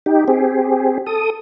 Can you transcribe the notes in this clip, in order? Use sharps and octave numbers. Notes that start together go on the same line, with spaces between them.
D#4 G4
C4 G4 G#4
A4 D#6